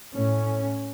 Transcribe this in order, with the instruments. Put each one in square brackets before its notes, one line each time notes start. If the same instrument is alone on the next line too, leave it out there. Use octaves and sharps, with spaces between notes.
[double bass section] A2 C#4